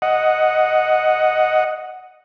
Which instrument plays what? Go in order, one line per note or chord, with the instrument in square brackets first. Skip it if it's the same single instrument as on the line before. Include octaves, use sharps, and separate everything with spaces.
[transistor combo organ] D#5 F#5